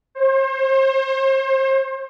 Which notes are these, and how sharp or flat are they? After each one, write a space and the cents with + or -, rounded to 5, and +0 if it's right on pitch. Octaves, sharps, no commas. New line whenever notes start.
C5 +35